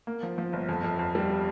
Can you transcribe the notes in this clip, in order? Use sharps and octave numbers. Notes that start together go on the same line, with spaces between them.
A#3
F3
F3
G1
F2
F2
F2
G3